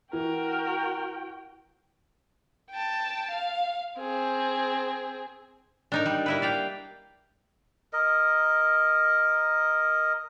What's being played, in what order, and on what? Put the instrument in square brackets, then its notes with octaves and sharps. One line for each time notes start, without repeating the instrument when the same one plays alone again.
[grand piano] E3 [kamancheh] F#4 G5 [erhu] A#4
[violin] G5 A5
F5
C4 G#4
[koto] D4 D#4 A#4
G3
A#3 E4 B4
D5 F5 G5
[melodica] A#4 D#5